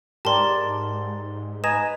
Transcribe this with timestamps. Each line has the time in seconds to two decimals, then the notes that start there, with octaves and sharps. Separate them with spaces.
0.25 G#2 G4 A#4 D5 A5 C6
1.64 B4 D#5 G#5 A#5 E7